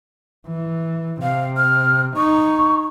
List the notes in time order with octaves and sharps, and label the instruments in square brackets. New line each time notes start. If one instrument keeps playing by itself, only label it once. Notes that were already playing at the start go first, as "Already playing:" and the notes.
[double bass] E3
[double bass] C3 [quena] F5
[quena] F6
[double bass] D#4 [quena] C#6